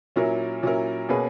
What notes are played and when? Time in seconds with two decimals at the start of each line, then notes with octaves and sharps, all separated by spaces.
0.16 A#2 F#3 C#4 E4 A#4
0.63 A#2 F#3 C#4 E4 A#4
1.09 B2 A#3 C#4 G#4 B4